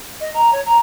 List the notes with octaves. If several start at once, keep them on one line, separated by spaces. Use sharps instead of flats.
D#5
A#5
C#5
A#5